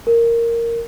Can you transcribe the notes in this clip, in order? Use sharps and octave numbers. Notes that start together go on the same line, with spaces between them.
A#4